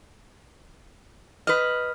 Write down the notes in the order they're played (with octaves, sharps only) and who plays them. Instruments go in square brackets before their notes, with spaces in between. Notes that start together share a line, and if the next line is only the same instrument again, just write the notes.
[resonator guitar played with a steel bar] B4 D#5 [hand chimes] F6